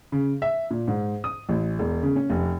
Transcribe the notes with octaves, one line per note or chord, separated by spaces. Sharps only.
C#3
E5
A#2
G#2
D#6
A1
E1
C#3
C#4
F1